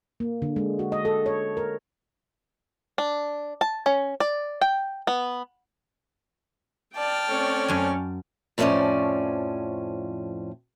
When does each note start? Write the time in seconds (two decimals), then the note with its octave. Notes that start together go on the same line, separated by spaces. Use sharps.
0.20 A#3
0.42 D3
0.56 G#3
0.79 F#4
0.92 D#5
1.05 A4
1.26 C#5
1.57 A#4
2.98 D4
3.61 A5
3.86 C#4
4.20 D5
4.61 G5
5.07 B3
6.96 D5 G5 A5 F6
7.28 A3 C4 C#4 C#5 D5
7.68 F#2 G#5
8.58 F2 A2 F3 A#3 C#4 D5